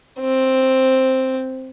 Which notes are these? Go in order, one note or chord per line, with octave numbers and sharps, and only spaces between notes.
C4